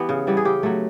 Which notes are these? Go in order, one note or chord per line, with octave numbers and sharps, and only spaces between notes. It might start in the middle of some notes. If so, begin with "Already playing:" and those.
Already playing: E3 B3 G4
C#3
E3 G3 B3
G#4
C#3 G4
F#3 A3